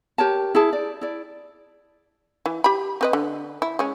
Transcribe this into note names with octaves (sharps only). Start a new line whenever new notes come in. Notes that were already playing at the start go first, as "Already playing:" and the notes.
G4 A#4 C#5 A5
E4 G#4 A5
D5
E4 D5
E3
G4 B5
C4 B4 D#5
D3
E4
G#3 C#4